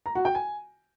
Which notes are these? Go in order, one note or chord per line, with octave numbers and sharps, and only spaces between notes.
A#5
F#4
G5
G#5